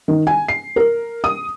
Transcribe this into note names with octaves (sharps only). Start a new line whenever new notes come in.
D#3
G#5
C7
A#4
D#6